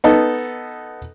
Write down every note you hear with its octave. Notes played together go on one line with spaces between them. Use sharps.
B3 D#4 A4